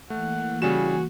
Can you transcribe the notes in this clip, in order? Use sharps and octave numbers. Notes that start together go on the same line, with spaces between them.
E3 A3 A#3 F#5
C#3 G3 F#4 G#5 E7